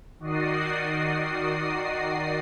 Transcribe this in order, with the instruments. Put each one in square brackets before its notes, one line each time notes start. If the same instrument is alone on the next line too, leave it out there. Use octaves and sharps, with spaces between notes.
[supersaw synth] D#3 F#4 D5 D#5 D#6 C7